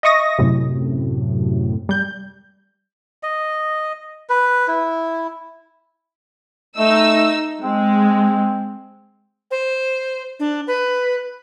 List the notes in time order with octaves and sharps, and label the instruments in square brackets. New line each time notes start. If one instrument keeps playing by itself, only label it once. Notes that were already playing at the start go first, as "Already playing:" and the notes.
[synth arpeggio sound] D#5 E5 C#6 D#6 A#6
F#2 A2 C3
G3 G6
[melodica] D#5
B4
E4
[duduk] A3 [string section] D#4 E6
[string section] G#3 [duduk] C4
[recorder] C5
D4
B4